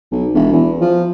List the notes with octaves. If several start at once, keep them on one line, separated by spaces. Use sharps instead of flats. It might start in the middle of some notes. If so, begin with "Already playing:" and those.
B1
E1
E2
F3